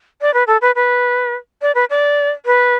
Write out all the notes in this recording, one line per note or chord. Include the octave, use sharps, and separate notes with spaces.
D5
B4
A4
B4
B4
D5
B4
D5
B4